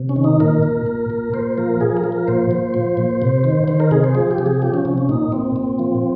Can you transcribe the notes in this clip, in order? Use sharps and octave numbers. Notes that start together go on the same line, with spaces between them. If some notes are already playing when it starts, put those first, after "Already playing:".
Already playing: C3
C#4
D#3
D#4
A#2 A#4
A#2
A#2
A#2
A#2 C5
F3 A#4
F3 G#4
A#4
F3
A#4
A#2 C5
A#2
F3
A#2
C3
D#3
D#3 C5
A#4
C3 G#4
C5
F3 G#4
G4
C3
G#4
F3 G4
C#4
C3 C#4
C#4
A#2 D#4
A#2 C4
A#2
F3